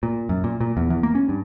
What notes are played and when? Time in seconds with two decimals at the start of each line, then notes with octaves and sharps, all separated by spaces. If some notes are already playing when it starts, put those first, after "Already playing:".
0.03 A#2
0.29 F#2
0.44 A#2
0.61 A#2
0.77 E2
0.90 E2
1.03 A#3
1.15 C#4
1.29 G2